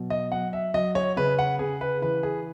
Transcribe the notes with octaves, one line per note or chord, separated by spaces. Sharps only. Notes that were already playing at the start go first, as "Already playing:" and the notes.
Already playing: B2 F#3
D#5
F#3 F#5
E5
F#3 D#5
C#5
C#3 B4
F#5
C#3 G#4
B4
E3 B4
G#4